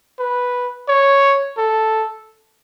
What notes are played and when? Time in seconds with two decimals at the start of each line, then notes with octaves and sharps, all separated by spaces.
0.19 B4
0.89 C#5
1.58 A4